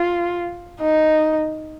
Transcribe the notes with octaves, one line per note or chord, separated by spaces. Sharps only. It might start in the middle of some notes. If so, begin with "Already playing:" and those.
Already playing: F4
D#4